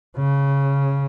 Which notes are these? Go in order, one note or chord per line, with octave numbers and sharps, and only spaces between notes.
C#3